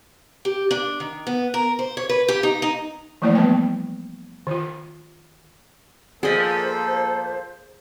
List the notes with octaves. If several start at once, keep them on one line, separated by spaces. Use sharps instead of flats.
G4
D4
D#3
B3
A#4
C5
C#5
B4
G4
D#4
D#4
E3 F3 A3 A#3 E4 D5
G3 A#3 B3 B4 G5
D#3 F4
A#2 F3 A#3 B3 G#4 A4 C5 D#5